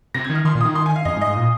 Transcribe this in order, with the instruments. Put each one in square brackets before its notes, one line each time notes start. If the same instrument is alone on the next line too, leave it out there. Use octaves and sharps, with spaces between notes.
[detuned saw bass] C3 [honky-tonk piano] A#6
[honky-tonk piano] G#6
[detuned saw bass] D#3
[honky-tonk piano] F6
[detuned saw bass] D#3 [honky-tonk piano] C6
[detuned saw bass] A#2
[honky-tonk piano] D#6
[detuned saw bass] D#3
[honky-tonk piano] C6
G#5
F5
[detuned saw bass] F2 [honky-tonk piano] D#5
[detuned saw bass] G#2
[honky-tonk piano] D#5
[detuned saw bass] G#2
A#2